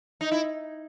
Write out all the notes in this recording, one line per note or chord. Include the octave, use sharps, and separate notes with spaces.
D#4
E4